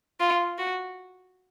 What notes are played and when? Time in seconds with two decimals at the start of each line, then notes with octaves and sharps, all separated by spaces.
0.20 F4
0.58 F#4